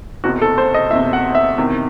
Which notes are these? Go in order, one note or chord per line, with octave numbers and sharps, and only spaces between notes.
F#1 E2 C3 F#4
A4
C5
D#5
F#1 E2 C3 E5
F#5
E5
E2 C3 D#3